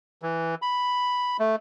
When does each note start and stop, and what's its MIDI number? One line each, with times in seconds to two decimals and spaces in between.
0.22 0.55 52
0.62 1.37 83
1.39 1.56 57